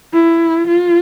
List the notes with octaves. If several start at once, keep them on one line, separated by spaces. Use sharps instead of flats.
E4
F4